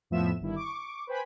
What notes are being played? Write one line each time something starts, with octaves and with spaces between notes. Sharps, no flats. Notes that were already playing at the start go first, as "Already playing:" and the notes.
F2 A2 F3 B3 E5 E7
G1 G2 D#3 E4
C#6 D6
B4 C5 G5 G#5 B5